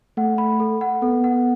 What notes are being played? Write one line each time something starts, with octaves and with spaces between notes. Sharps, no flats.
A3 F#5
B5
A4
F#5
B3 A4
F#5